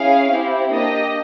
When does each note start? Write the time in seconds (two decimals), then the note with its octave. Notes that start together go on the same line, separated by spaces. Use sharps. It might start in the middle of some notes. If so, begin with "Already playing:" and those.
Already playing: C#4 E4 G#4 F5
0.29 C4 E4 G4
0.72 A#3 D4 G4 D#5